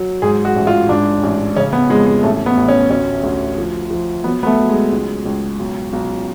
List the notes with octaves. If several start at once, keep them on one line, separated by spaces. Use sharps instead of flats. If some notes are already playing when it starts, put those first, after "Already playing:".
Already playing: F#3
G#2 G#4
F#4
A1
F4
G#2 D4
A1
C#3 C#4
B3
F2 G#3
G#3
A1 A3
B3
A1
C#4
D2 C#4
D2
F3
F3
F#3 B3
B3
A3
F#3
G#3
C#2
C#2
B1
B1